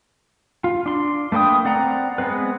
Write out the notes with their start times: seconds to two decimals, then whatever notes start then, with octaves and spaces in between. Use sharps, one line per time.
0.64 F4
0.86 D4 C6
1.32 A3 A#3 B4 G5 D#6
1.65 C4 D5 F#5 A#5
2.18 G#3 B3 C4 B4